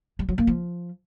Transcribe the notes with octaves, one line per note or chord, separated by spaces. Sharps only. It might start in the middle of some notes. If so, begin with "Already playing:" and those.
G3
F#3
A#3
F3